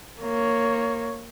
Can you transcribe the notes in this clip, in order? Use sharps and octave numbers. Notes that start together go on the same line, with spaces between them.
A#3 C#5